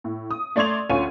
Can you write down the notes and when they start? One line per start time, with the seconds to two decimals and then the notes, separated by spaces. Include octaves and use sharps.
0.04 A2
0.31 D#6
0.56 A3 D5 C6 G#6 F7
0.89 D2 C#4 F4 C#5 G#5 D#7